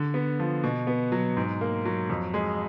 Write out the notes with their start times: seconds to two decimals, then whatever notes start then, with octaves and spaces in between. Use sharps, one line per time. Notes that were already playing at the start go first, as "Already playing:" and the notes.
Already playing: D3
0.14 B3
0.40 F3
0.64 B2
0.87 B3
1.12 F#3
1.37 G#2
1.61 A#3
1.85 F#3
2.10 F2
2.34 G#3